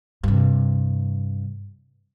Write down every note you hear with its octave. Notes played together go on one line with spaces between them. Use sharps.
G2 C3